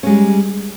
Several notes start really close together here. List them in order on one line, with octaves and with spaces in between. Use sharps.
C#4 G#3 G3